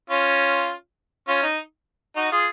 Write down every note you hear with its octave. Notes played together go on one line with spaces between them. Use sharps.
C#4 F4
C#4 F4
D#4
D#4 F#4
F4 G#4